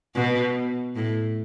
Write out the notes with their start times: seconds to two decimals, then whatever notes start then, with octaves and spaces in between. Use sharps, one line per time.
0.15 B2
0.96 A2